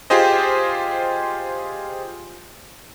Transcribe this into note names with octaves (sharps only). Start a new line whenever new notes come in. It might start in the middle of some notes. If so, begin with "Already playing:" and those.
F4 G4 G#4 C5 D#5